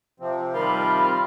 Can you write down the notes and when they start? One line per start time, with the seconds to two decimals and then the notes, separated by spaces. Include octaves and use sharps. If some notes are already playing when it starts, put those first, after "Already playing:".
0.20 C3 F3 C4
0.54 D#3 G3 F4 A#4 B5